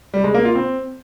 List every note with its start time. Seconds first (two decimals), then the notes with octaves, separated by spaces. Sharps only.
0.14 G3
0.24 G#3
0.34 A#3
0.45 F4
0.55 C4